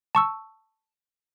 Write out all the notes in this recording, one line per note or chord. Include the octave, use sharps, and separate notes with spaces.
A5 C#6 E6